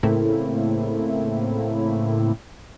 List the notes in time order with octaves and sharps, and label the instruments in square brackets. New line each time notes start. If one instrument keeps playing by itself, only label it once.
[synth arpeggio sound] A2 C#3 A3 A#3 C4 E4